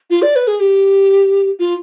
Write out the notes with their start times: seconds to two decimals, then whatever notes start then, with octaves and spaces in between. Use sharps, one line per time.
0.10 F4
0.22 D5
0.36 B4
0.48 G#4
0.60 G4
1.59 F4